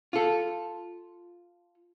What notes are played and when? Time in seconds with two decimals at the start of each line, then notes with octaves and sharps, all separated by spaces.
0.13 F4 A4